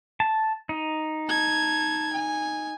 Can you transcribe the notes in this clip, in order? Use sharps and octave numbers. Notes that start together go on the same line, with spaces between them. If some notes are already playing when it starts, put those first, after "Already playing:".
A5
D#4
A5 G#6
G#5